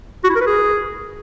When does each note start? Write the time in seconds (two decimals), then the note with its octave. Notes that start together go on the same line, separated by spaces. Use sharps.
0.24 F#4
0.30 E4
0.35 A#4
0.41 B4
0.47 G#4